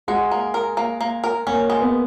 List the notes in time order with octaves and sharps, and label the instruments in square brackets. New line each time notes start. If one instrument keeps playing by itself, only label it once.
[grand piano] G#3 [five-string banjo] F#4
[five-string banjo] A#3
A#4
A#3
A#3
A#4
[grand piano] A#3 [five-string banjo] C#4
[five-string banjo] G#3
[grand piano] B3